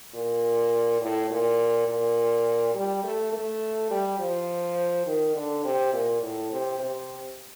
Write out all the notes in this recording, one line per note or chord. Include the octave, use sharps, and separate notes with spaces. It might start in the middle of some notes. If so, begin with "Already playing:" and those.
A#2
A2
A#2
A#2
G3
A3
A3
G3
F3
D#3
D3
C3
A#2
A2
C3
C3